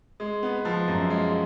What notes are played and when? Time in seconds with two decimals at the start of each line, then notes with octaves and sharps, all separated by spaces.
0.20 G#3
0.43 B3
0.65 F3
0.88 F#2
1.10 G#3